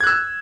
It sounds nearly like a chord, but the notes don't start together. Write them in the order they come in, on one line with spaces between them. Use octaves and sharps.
G#6 F#6 E6